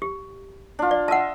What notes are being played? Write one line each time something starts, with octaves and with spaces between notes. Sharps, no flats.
G4
D4 F4
D5
D#5 E5 F#5 A5